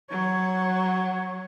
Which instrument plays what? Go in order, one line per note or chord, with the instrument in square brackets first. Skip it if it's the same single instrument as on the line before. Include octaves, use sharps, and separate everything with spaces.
[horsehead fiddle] F#3 C#5